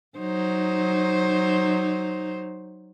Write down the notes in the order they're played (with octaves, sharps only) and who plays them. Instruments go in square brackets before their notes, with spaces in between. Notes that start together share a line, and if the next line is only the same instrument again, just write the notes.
[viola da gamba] F#3 D#4 C5